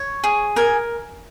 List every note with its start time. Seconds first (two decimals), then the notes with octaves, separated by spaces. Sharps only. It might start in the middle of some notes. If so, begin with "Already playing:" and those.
Already playing: C#5
0.24 G#4
0.56 A#4 G#5